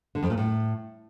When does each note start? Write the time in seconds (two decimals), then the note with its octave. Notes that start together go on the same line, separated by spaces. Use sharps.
0.15 D3
0.23 F2
0.30 A#2
0.38 A2